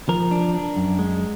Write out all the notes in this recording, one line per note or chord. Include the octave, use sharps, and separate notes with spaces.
F3 A#4
D4
D4
F#2
G#3